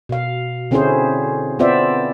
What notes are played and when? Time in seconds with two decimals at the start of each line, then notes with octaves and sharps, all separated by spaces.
0.09 B2 F5
0.71 D3 C4 C#4 E4 G#4 C5
1.59 B3 C4 F4 C5 D5 E5